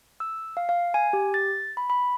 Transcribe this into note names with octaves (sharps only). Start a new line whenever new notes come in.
E6
F5
F5
G#5
G4
A6
B5
B5